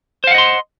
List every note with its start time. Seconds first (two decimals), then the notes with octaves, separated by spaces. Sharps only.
0.24 C5
0.27 F5
0.31 F#5
0.35 D#5
0.38 C6